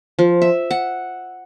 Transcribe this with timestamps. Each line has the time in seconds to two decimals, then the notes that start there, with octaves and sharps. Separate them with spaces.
0.19 F3
0.42 E5
0.71 F#5